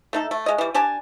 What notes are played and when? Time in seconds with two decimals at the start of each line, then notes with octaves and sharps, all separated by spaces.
0.13 A3 D#4 A4
0.31 A3
0.46 G#3 D#5
0.58 E3 G3
0.74 D4 G4 G#5 A5